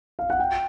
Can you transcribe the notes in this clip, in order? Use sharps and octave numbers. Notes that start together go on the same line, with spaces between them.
F5
F#5
G5